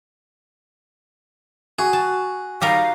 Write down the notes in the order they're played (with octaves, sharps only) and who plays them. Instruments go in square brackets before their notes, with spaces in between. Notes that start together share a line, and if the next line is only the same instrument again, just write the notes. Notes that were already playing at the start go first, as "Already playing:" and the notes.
[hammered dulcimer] F#4 [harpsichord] G#4
[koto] A5
[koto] G3 D#4 A#4 [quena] F5